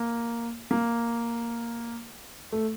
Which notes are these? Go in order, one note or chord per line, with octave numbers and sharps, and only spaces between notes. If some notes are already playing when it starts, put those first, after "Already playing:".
Already playing: A#3
A#3
A3